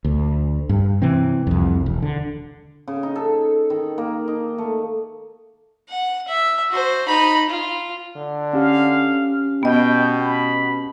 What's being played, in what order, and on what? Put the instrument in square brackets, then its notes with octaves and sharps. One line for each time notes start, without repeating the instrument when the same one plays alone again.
[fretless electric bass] D2
G2
C3 E3 C4
C2 F2
E1
D3
[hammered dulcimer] C#3
D#4
A4
D#3
A#3
D#4
A3
[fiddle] F#5
E5
F#4 C5
D#4 B5
F4
[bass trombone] D3
[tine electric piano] C#4 G4 [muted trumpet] F5
[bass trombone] B2 [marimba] B3 D#5 [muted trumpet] G5
[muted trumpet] B5